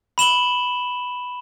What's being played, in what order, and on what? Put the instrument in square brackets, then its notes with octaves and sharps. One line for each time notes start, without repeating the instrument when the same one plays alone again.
[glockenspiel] B5 E7 F#7 G7